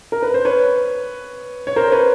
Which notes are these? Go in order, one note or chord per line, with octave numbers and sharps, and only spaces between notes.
A#4
B4
C5
B4 C#5
C#5
A#4 C5
B4 C#5